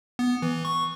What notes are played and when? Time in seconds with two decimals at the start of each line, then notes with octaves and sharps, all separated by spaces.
0.19 B3
0.42 E3
0.65 C#6